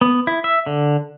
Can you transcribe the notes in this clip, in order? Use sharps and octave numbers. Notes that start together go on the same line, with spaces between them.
B3
E4
E5
D3